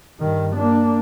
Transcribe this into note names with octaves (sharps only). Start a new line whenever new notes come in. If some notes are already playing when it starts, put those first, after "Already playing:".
G2 D#3
A#3 D4